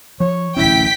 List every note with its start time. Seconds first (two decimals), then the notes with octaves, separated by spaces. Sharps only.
0.20 F3 C#5
0.57 D1 A1 C#4 E4 G5 B6